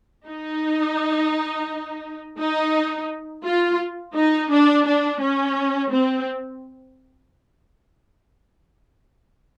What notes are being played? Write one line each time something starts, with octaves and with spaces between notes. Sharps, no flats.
D#4
D#4
F4
D#4
D4
D4
C#4
C4